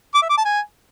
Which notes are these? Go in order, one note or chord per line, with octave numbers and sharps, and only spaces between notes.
D6
E5
D6
A5
G#5